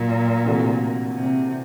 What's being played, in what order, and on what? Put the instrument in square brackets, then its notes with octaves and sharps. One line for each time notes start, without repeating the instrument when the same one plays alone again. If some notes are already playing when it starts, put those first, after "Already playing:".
Already playing: [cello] A#2 [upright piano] F#3
[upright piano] C3 E3 A3 D4 F#4
[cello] C3